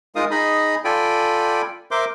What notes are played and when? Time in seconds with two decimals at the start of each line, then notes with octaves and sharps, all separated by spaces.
0.15 G#3 D#4 F4 A#4 F5 D#6
0.31 D#4 G#4 D#5 B5
0.85 F4 A4 D5 G5 G#5 B5
1.91 A#4 C5 E5 C6 D6